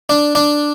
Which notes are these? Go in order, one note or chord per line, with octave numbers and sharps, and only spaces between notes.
D4
D4